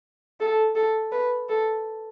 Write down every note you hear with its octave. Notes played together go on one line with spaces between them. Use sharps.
A4
A4
B4
A4